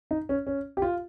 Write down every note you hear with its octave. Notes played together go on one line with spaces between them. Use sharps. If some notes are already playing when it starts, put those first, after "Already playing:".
D#4
C#4
C#4
G4
F4